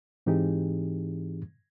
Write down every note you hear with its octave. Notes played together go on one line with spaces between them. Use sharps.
G#2 E3 C4 D#4 G4 G#4